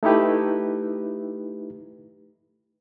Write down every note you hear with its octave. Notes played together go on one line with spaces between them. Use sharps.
A3 D#4 E4 G4 B4